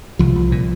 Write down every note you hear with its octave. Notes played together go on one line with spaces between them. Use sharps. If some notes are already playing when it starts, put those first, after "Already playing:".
C2 F3
C2
A#2